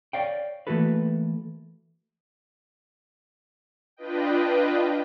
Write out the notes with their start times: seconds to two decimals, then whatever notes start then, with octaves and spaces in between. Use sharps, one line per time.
0.13 C#5 D5 F5 G5
0.67 E3 A3 A#3 F#4 A4 B4
3.97 D4 F4 B4 D#5 G5